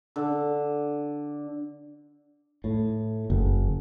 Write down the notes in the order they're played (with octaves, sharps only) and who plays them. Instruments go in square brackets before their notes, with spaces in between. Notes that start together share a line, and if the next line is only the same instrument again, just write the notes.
[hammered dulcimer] D3
[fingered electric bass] A2
F#1